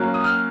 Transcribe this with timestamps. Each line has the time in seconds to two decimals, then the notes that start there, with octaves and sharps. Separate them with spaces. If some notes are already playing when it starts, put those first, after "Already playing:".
Already playing: F#3 A#3 C#4 F#6
0.14 D#6
0.24 F6